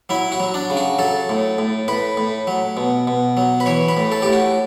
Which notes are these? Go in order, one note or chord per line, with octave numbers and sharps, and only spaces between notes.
F#3 E4
F#4
F#3
D4
C#3
F#4
F#3 A4
A2
A2
A2 B4
A2
F#3
B2
B2
F#3
B4
E3 C#5
B4
A2
A4
A2 G4
F#4